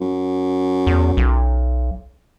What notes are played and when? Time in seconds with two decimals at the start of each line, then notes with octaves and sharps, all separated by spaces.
0.01 F#2
0.87 E2
1.17 B1